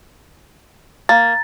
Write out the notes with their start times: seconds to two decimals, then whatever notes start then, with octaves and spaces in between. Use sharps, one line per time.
1.09 A#3 A#5 A6